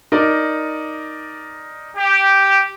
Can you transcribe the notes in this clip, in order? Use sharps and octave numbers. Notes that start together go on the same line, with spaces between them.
D#4 A#4 D5
G4